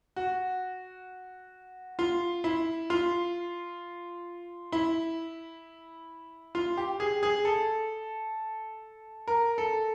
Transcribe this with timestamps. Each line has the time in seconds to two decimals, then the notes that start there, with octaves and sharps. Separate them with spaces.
0.16 F#4
1.99 F4
2.44 E4
2.90 F4
4.72 E4
6.55 F4
6.77 G4
7.00 G#4
7.23 G#4
7.45 A4
9.28 A#4
9.58 A4